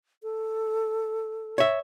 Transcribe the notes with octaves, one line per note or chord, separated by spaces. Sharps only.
A4
C#5 E5